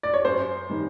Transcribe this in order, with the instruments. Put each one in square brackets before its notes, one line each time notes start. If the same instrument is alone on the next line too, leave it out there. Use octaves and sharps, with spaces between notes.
[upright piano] D5
C#5
F#2 C5
D#3 G3